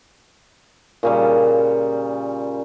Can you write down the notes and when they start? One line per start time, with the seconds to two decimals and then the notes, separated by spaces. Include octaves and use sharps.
1.03 A#2 C#3 G3